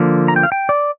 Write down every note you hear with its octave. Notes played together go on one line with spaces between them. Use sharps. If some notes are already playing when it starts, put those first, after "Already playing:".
Already playing: D3 F3 A#3
A#5
G5
F5
G5
D5